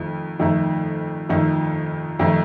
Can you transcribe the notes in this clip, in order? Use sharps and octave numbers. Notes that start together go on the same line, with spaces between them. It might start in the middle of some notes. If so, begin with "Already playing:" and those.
Already playing: F2 D#3 A3
F2 D#3 A3 D#4
F2 D#3 A3 D#4
F2 D#3 A3 D#4